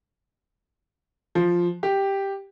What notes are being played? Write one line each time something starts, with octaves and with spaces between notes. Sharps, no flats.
F3
G4